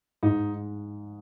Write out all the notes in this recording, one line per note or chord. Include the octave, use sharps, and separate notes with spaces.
G#2 D#4